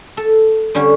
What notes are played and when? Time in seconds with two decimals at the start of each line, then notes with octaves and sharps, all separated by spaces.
0.17 A4
0.75 D3 G3 C#4